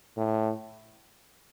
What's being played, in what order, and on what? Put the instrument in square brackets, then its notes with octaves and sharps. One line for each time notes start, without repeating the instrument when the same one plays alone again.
[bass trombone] A2